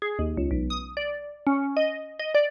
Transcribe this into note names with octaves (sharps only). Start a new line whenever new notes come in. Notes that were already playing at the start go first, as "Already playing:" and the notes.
G#4
D#2
C#2
B1
D#6
D5
C#4
D#5
D#5
D5